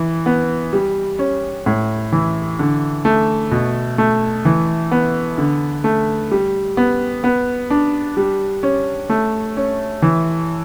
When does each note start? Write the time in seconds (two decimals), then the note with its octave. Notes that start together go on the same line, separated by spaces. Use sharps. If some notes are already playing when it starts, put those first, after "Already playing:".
Already playing: E3
0.26 B3
0.73 G3
1.19 C#4
1.66 A2
2.12 E3
2.59 D3
3.05 A3
3.51 B2
3.98 A3
4.45 E3
4.91 B3
5.38 D3
5.84 A3
6.31 G3
6.77 B3
7.24 B3
7.70 D4
8.17 G3
8.63 C#4
9.09 A3
9.57 C#4
10.02 E3